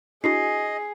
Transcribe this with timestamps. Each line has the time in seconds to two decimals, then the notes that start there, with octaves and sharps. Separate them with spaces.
0.24 D4 E4 F#4 G#4 D#5 C7